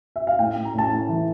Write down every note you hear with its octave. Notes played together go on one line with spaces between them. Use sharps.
E5
F5
A2 G5
A2
A#5
A2 A5
A2
E3